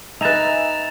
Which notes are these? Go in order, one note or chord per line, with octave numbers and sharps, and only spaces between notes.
D#4 B4 E5 G#5 A#5 A6 E7 F7